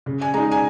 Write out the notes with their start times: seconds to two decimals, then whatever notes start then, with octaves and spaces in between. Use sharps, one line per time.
0.06 C#3
0.21 G#5
0.33 G#3 D#4 A#5
0.51 G#5